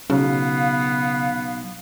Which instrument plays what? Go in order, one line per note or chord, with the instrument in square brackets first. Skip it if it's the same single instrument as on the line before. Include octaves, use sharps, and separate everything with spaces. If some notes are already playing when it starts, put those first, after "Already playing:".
[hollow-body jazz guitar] B1 [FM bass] C#3 [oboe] B3 [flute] F5